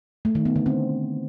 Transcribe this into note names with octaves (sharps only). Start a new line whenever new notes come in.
A3
D#3
B3
D3
C4